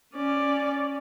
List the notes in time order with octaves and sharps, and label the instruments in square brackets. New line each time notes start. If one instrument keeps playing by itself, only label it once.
[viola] C#4 D5